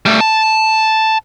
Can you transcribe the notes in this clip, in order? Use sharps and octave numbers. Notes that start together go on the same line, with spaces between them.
G3 A3
A5